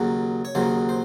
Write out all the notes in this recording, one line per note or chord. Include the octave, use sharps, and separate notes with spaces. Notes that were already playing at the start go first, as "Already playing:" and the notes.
Already playing: D#2 C#3 F#3
C#5
D#2 C#3 F#3 C5
C5